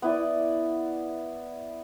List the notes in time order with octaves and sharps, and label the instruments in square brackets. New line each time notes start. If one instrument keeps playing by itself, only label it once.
[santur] B3 E4 D5